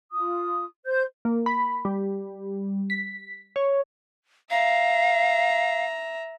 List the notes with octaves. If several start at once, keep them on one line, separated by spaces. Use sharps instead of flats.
F4 D#6
C5 G6
A#3
B5
G3
B6
C#5
E5 F5 A#5